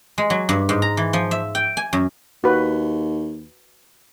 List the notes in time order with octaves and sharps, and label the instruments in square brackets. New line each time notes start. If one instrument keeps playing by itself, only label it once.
[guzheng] G#3
F#3
G2
G#2
A#5
E3
F3
E5
G5
G#5
F#2
[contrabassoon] D#2 [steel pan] F#4 B4